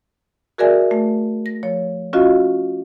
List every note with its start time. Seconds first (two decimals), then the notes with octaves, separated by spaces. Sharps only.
0.58 F#4 G#4 A#4 D5 E5 G#5
0.91 A3
1.46 A#6
1.63 F3 C#5
2.13 C#4 F4 F#4 D#5 F5